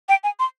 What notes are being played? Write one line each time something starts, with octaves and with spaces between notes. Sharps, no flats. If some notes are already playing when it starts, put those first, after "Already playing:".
G5
G#5
C6